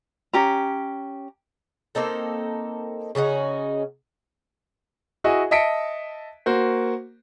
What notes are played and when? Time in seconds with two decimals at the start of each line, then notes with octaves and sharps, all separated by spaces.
0.33 C#4 G4 A#5
1.95 A#3 C4 D#4 A4
3.15 C#3 C#4 D#4 F#4
5.24 E4 F#4 G#4 D#5 E5
5.51 D#5 E5 A5 B6 C#7 D7
6.46 A#3 F#4 C5